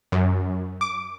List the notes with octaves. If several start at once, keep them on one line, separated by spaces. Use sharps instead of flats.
F#2
D6